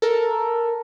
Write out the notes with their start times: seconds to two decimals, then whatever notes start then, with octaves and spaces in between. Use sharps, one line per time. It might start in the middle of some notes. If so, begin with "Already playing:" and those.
0.02 A4 A#4